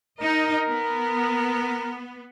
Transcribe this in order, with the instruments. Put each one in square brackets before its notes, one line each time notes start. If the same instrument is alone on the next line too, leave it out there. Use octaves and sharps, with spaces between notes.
[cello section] D#4 D#5 [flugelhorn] A#4
[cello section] B3